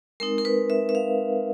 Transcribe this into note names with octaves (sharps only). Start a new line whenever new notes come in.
G#3 C4 D#4 A#4
A#4
B4
E5
E5
F5